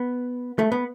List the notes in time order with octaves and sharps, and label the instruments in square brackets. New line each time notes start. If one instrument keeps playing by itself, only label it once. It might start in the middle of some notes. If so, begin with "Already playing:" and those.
Already playing: [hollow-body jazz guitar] B3
A3
B3